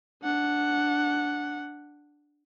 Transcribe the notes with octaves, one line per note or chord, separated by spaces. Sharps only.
D4 F#5